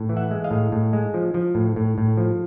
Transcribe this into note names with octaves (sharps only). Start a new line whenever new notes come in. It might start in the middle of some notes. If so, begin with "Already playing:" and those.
Already playing: A2
E3
E5 F#5
G#3
D#5 F5
A2
A2
G#3
F3
F3
A2
A2
A2
F3